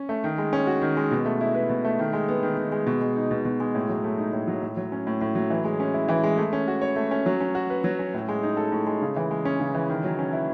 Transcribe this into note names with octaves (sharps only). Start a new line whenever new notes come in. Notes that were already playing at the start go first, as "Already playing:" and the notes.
Already playing: C#4
A3
D#3
G#3
C#4
F#4
D#3
G#3
B2
A3
E4
B4
B2
A3
D#3
G#3
B3
D#3
D#3
G#3
B2
G#3
D#4
B2
B2
G#3
A2
F#3
A3
D#4
A2
F#3
A2
F#3
C#4
A2
A2
F#3
E3
G#3
C#4
E4
E3
G#3
A3
C#4
F#4
C#5
A3
C#4
F#3
C#4
F#4
B4
F#3
C#4
A2
G#3
D#4
A4
A2
G#3
C#3
E3
G#3
C#4
C#3
E3
D#3
F#3
C#4
E4